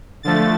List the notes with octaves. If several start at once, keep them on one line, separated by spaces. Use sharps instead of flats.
D3 F3 A3 A6